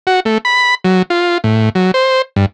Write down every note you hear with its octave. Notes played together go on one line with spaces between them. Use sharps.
F#4
A3
B5
F#3
F4
A2
F#3
C5
G2